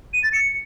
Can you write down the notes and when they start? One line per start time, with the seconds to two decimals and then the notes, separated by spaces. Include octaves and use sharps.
0.14 D#7
0.23 A6
0.33 C#7